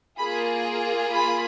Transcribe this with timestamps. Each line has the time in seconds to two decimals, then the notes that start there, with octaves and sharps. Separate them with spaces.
0.19 A#3 F4 G#4 B5
1.12 B5